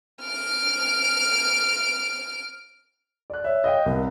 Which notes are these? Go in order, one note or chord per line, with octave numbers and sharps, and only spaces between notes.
F6 D7
D5 F#6
C#5 E5
D#5 F5 G5
C2 A#4